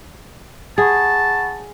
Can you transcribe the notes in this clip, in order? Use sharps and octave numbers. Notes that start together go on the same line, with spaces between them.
G#4 F#5 A5 B5 C#6